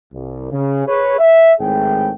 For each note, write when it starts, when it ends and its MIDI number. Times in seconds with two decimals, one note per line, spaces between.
0.13 0.49 36
0.52 0.86 49
0.87 1.16 68
0.87 1.16 71
0.87 1.16 73
1.19 1.52 76
1.60 2.10 32
1.60 2.10 45
1.60 2.10 68
1.60 2.10 79